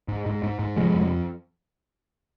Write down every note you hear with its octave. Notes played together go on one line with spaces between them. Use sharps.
G#2
G#2
G#2
G#2
C3 F3 G#3
F2